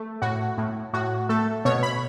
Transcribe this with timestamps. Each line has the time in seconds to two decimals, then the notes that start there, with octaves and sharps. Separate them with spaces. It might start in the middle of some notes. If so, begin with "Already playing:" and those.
Already playing: A3
0.22 A2 F#4
0.58 A2
0.93 A2 F#4
1.29 A3 A4
1.65 B2 C#5
1.83 B5